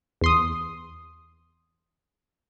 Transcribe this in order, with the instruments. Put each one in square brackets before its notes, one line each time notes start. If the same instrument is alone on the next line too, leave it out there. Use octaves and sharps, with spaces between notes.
[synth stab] E2 C6 D#6